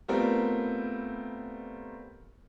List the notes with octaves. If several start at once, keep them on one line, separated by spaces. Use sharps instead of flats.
G3 A3 B3 C4 F4 A#4